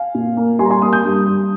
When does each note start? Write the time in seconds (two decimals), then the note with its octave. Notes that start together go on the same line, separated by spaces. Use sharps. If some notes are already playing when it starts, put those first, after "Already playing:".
Already playing: F5 G#5
0.14 A#2
0.37 A#3
0.59 G3 G#5 C6
0.65 A#5
0.70 G#5 C6
0.82 A#3 C6 D#6
0.93 D#6 G6
1.04 G2
1.26 G2